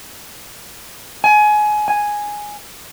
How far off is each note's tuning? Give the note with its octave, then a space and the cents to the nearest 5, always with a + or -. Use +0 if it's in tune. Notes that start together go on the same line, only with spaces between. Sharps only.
G#5 +25
G#5 +0